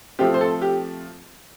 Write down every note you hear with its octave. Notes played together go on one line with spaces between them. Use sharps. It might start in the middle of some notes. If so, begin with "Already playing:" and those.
F3 A3 C4 G4
C5
A4
G4